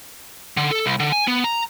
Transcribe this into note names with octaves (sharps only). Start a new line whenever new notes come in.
D3
A4
C2
D3
G#5
B3
A#5